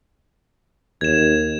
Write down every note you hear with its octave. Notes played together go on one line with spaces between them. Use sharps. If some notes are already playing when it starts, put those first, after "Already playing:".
D#2 G#6 E7